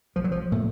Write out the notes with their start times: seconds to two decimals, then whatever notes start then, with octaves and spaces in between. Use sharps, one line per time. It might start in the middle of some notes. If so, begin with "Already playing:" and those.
0.16 B1 F3
0.24 F#3
0.32 F3
0.52 A#2 A3